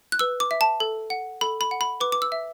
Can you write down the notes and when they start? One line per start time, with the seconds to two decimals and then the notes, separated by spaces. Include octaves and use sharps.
0.12 F#6
0.19 B4 E6
0.40 D6
0.51 E5
0.61 A5
0.80 A4
1.10 F#5
1.41 A4 B5
1.61 B5
1.71 F#5
1.81 B5
2.00 B4 D6
2.12 D6
2.22 E6
2.32 E5